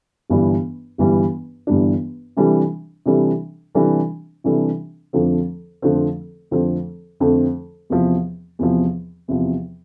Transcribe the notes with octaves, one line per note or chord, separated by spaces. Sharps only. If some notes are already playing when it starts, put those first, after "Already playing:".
G1 G2 E3 G3 D4
G1 G2 E3 G3 D4
G1 G2 E3 G3 D4
C3 E3 G3 D4 A4
C3 E3 G3 D4 A4
C3 E3 G3 D4 A4
C3 E3 G3 D4 A4
F2 D3 F3 A3 C4
F2 D3 F3 A3 C4
F2 D3 F3 A3 C4
F2 D3 F3 A3 C4
E2 C3 F3
E2 C3 F3
E2 C3 F3